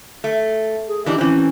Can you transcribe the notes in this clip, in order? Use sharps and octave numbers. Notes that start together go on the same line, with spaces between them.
A3
G#4
E3 D4 D#4 G4
E3 C4 C#4